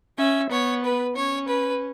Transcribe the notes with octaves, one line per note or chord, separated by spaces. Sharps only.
C#4 E5
B3 C#5
B4
C#4 C#5
B4